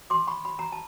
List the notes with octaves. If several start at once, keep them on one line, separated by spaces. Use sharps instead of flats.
C6 D6
B5 C#6
B5
A#5
A5